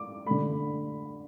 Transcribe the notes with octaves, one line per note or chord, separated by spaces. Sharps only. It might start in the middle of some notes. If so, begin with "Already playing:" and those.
Already playing: D6
D3 A3 B5